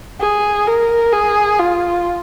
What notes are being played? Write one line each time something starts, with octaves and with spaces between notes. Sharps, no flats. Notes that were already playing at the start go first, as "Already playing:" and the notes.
G#4
A#4
G#4
F4